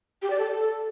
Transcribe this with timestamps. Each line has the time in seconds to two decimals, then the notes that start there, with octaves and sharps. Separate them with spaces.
0.22 G4
0.30 D5
0.38 A4